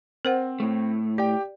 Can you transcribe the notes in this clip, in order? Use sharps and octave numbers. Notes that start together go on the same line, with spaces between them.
C4 A#4 C5 F#5
A2 A3
G4 D5 G5